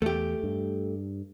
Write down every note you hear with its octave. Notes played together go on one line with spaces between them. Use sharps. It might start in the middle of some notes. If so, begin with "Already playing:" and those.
E2 A3 G4
G2